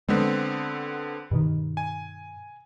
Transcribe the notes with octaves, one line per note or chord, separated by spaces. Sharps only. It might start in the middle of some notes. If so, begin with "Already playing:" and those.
D3 G#3 B3 C4
G2 B2 D#3
G#5